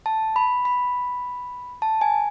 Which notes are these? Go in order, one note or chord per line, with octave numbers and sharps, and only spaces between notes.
A5
B5
B5
A5
G#5